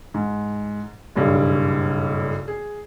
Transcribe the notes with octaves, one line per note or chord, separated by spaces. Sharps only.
G#2
F#1 B1 G2
G#4